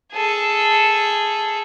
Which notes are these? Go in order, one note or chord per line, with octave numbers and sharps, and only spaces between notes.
G#4 A4